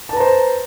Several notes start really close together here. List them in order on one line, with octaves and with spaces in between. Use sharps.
A5 B4 A#5 C5